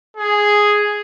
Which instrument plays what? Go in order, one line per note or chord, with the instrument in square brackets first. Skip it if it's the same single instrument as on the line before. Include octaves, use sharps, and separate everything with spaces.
[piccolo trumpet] G#4